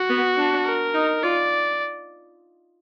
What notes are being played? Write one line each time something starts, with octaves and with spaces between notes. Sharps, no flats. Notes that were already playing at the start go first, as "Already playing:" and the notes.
Already playing: F#4
B3
D4
A#4
D#4
F4 D5